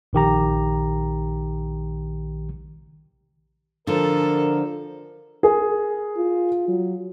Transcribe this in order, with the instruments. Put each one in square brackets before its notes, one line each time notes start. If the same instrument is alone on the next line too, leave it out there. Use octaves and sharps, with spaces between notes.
[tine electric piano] A#1 D#3 G4 A#5
[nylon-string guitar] D3 F3 [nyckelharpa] A4 [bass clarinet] A#4
[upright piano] G#4 A#4
[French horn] F4
F#3